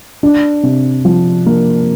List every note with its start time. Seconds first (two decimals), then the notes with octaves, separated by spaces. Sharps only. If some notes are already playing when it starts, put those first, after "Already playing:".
0.23 D4
0.63 C3
1.05 F3
1.46 A#3